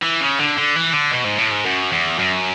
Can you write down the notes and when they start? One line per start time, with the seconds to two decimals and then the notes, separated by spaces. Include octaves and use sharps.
0.03 E3
0.21 C#3
0.39 D3
0.57 D3
0.76 E3
0.93 D3
1.11 B2
1.24 G#2
1.38 A2
1.51 G#2
1.65 F#2
1.92 E2
2.19 F#2